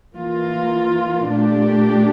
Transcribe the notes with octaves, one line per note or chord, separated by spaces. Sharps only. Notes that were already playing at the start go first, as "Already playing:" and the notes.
E3 A#3 F4
A#2 A3 D4 G4